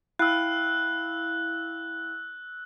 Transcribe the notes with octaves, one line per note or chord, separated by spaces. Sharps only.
E4 F5 G5 E6 F#6